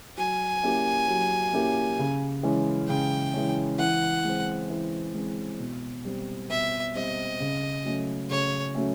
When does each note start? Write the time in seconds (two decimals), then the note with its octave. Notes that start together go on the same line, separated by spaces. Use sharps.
0.17 F#3 G#5
0.63 A#3 C#4 E4 G4
1.08 F#3
1.53 A#3 C#4 E4 G4
1.99 C#3
2.43 E3 G#3 C#4
2.88 C#3 G5
3.34 E3 G#3 C#4
3.79 E3 F#5
4.25 G#3 C4
4.70 E3
5.15 G#3 C4
5.59 B2
6.05 G3 C4
6.50 B2 E5
6.95 G3 C4 D#5
7.40 C#3
7.85 F#3 A3 C#4
8.30 C#3 C#5
8.75 F#3 A3 C#4